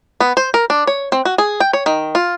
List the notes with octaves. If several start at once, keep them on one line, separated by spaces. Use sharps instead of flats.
B3
C5
A#4
D4
C#5
C4
F#4
G#4
G5
C#5
D#3
F4